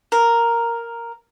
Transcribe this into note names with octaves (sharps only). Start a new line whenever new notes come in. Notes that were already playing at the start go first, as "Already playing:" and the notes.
A#4